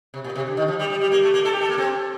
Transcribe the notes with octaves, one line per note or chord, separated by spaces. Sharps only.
C3
A#2
C3
D3
D#3
F3
G3
G3
G3
A#3
A3
A#3
A4
G4
A4
A#3
C4